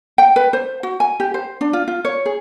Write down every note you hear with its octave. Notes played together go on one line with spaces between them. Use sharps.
G5
B4
C5
F#4
G#5
G4
C5
D4
F4
F4
C#5
G#4